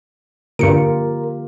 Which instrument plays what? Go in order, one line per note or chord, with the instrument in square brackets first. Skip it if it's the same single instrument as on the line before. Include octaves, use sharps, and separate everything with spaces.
[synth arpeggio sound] G2 C#7 D7 [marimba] D3 [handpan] A#3 F4 G4 [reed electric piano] A#4